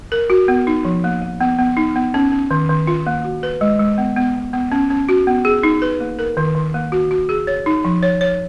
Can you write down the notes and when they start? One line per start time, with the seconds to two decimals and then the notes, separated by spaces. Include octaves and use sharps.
0.12 A#4
0.30 F#4
0.48 B3
0.67 D#4
0.85 F3
1.04 A#3
1.22 A#3
1.41 B3
1.59 B3
1.77 D#4
1.96 B3
2.14 C#4
2.32 C#4
2.51 D#3
2.69 D#3
2.87 F4
3.07 A#3
3.25 F#4
3.43 B4
3.61 G#3
3.79 G#3
3.98 B3
4.16 B3
4.35 B3
4.53 B3
4.72 C#4
4.90 C#4
5.09 F#4
5.27 B3
5.45 G#4
5.63 D#4
5.82 B4
6.00 A#3
6.19 A#4
6.37 D#3
6.55 D#3
6.74 A#3
6.92 F#4
7.11 F#4
7.29 G#4
7.47 C#5
7.66 D#4
7.85 F3
8.03 C#5
8.21 C#5